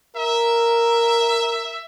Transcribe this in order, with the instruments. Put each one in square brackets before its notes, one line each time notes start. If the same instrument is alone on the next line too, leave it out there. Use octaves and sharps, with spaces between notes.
[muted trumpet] A#4 [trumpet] E5